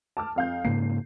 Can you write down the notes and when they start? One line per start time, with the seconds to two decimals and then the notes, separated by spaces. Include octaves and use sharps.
0.17 A5 D6 F6
0.36 F2 F5 G6
0.65 G#2 C#3 A#3 C7